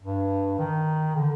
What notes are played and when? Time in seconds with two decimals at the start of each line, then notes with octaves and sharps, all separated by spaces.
0.03 G2
0.59 D#3
1.16 D3